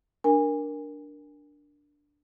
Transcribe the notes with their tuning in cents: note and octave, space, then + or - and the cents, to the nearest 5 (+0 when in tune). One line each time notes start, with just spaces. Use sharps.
D4 +0 A#4 +10 G#5 -25